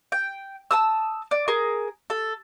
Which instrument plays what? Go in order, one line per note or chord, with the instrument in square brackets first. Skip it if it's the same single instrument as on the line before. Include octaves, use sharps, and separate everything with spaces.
[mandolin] G5
A5 D#6 E6
D5
G#4 A#4
A4